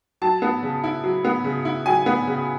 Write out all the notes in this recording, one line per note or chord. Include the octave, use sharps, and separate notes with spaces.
F#3 A5
B3
C#3
E4
F#3
B3
C#3
E4
F#3 G#5
B3
C#3